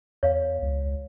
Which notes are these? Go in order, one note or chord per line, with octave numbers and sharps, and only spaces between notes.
E2 C#5 F5
C#2